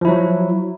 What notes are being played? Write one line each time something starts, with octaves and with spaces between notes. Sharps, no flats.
F3 F#3 E4